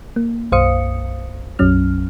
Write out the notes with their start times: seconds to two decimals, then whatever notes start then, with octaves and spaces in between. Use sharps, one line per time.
0.16 A#3
0.52 B1 F#2 C5 F5 D#6 C#7
1.59 B1 F#2 F#3 C#4 F6